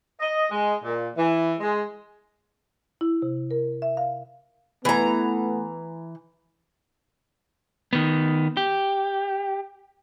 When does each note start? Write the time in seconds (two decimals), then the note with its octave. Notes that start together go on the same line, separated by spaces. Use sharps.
0.20 D#5
0.51 G#3
0.84 A#2
1.17 E3
1.60 G#3
3.01 E4
3.22 C3
3.51 A#4
3.82 E5
3.97 F5
4.85 E3 A3 B3 A#5
7.93 D#3 B3
8.57 G4